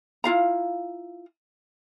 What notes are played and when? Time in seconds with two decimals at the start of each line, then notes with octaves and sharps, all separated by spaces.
0.24 E4 F4 F5 A#5